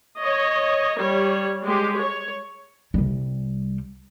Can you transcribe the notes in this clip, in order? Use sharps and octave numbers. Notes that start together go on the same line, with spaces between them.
C#5 D#5
G3 C#5
G#3 G4
C#5
C2 G3